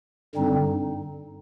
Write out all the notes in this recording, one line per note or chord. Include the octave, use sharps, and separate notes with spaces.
G2 D3 G3 C4 D#4